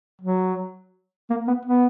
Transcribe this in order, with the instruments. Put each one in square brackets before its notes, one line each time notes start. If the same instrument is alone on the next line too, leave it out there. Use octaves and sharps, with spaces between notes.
[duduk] F#3
A#3
B3
B3